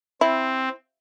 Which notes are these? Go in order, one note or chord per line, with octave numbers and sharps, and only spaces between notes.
C4 E4